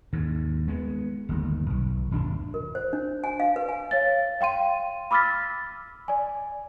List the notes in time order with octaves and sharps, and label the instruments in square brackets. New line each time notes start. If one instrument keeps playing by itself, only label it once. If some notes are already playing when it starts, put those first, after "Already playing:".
[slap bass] D#2 G#2
G#3 B3
G1 D#2
B1
D#1 G#1 D4
[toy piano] A#4
C5
D4
G#5
F5
B4
G#5
[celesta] C#5 F5 A6
F5 G5 C6 D#7
B5 D6 E6 F6 A6 B6
D5 G#5